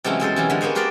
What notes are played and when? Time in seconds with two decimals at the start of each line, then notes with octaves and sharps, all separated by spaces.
0.04 C3 E3 F#3 G#3 A3 C#4
0.20 B2 G#3 A4 C5
0.36 C3 E3 F#3 C#4
0.50 D3 G#3
0.61 A#3 B3 G#4 C5 C#5
0.75 F#4 G4 A#4 C5 D5